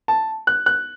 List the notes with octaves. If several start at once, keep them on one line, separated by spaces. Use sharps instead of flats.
A5
F#6
F#6